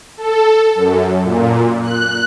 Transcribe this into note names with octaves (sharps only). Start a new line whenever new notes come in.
A4
F#2
A#2
F#6